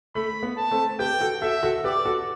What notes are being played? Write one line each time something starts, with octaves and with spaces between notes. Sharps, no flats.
A3 B5
B3
A5
A3 C4
G4 B4 G5
F#4 A4
F#4 A4 E5
F#4 A4
G4 B4 D5
F#4 A4